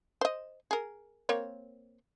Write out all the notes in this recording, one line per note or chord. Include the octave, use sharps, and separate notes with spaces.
C5 D#5
G#4 A#4
A#3 C4 C#5